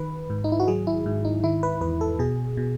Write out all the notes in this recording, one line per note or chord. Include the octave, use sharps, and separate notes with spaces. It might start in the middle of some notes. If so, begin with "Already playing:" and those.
Already playing: D#3 B4
G#2
D#4
E4
F#4
F#3 G#4
E4
G#2
D#4
D#3 E4
B4
E2 B4
A4
B2 G#4
B2